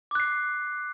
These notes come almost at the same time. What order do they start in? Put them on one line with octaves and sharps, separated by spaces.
D6 F#6 C7